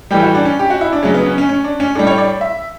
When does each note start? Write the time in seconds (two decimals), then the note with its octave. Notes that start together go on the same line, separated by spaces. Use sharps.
0.11 A2 E3 G3 G4
0.23 F#4
0.35 D4
0.45 C#4
0.59 G4
0.70 F#4
0.81 E4
0.93 D4
1.03 C#3 F#3 C#4
1.14 B3
1.26 C#4
1.38 C#4
1.49 C#4
1.64 D4
1.80 C#4
1.95 A2 G3 D4
2.07 C#5
2.18 D5
2.41 E5